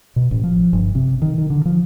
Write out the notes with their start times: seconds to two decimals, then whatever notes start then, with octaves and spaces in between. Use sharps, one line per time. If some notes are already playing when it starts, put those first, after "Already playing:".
0.16 B2
0.31 A1
0.44 F3
0.73 G1
0.95 C3
1.22 D#3
1.38 D#3
1.50 D3
1.65 F3